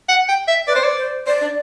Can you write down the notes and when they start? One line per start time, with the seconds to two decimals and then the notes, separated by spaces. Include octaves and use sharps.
0.09 F#5
0.29 G5
0.48 E5
0.67 B4 D5
0.75 C5
0.84 D5
0.98 C5
1.27 C5 D5
1.41 D4